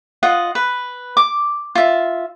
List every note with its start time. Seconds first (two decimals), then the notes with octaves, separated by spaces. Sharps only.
0.23 F4 D#5 F#5
0.55 B4
1.17 D6
1.75 F4 E5